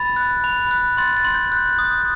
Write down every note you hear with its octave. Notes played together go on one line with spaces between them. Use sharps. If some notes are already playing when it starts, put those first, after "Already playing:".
Already playing: B5 A6
F#6
B5
F#6
C6 A6
A6
C6
G6
F#6
D#6